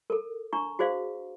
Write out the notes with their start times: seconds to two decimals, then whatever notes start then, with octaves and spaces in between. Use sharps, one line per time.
0.10 A4 A#4
0.53 D4 A#5 C#6
0.79 F#4 G#4 C5 D5 F5